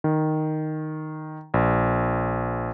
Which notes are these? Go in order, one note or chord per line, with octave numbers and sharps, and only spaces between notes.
D#3
A#1